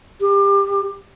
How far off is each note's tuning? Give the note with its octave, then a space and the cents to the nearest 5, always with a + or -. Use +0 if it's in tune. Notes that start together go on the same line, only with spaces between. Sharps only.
G4 +25